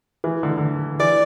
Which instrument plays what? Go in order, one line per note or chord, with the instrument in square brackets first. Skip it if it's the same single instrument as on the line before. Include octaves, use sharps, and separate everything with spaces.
[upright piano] E3
D3
D3
[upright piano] E3 [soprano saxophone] D5